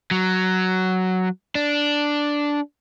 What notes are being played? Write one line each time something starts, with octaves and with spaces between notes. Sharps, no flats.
F#3
D4